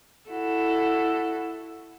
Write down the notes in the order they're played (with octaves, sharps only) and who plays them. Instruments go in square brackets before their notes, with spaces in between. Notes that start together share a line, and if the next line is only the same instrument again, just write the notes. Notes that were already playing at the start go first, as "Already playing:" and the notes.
[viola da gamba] E4 F#4 A4